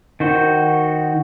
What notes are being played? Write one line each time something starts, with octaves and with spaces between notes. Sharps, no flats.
D#3 F#4 C5